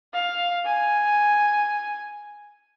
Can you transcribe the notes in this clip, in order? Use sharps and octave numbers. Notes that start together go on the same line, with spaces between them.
F5
G#5